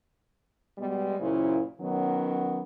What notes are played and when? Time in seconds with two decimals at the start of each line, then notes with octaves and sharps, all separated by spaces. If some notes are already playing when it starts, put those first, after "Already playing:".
0.78 B2 G3 G#3 B3
1.19 F#2 A#2 C#3 E4 C5
1.80 D#3 F#3 B3 C#4